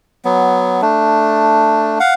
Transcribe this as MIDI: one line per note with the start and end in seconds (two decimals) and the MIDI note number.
0.25 0.81 54
0.25 0.81 59
0.82 1.99 57
0.82 1.99 62
2.00 2.14 77
2.00 2.14 78